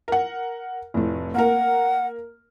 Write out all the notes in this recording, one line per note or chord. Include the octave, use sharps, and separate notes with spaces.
A#4 F#5
F1 A2
A#3 A#4 F#5